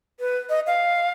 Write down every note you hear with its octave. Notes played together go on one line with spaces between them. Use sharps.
B4
D#5
F5